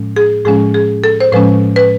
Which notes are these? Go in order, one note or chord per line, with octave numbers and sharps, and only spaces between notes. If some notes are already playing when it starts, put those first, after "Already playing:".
Already playing: A2 F3 G#3 C#4
G#4
A2 F3 G#3 C#4 G#4
G#4
A4
C5
A2 F3 G#3 C#4 B4
B4